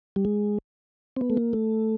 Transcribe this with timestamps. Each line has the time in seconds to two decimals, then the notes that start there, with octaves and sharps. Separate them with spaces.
0.16 G3
0.25 G#3
1.16 C4
1.21 B3
1.30 A3
1.37 A#3
1.53 A3